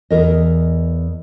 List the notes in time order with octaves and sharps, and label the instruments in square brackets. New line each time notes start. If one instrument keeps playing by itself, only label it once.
[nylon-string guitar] E2 A#4 D#5